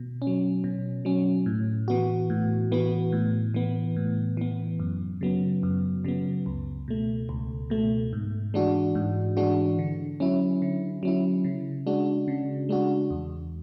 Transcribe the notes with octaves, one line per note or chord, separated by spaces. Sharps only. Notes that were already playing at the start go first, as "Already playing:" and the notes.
Already playing: B2
C#4
F#3
B2
F#3 C#4
A2
E3 B3 F#4
A2
E3 B3 F#4
A2
E3 B3
A2
E3 B3
F#2
C#3 F#3 B3
F#2
C#3 F#3 B3
C#2
B2 A3
C#2
B2 A3
G#2
E3 G#3 D4 F#4
G#2
E3 G#3 D4 F#4
D3
F#3 C#4 E4
D3
F#3 C#4 E4
C#3
G#3 D4 F#4
C#3
G#3 D4 F#4
E2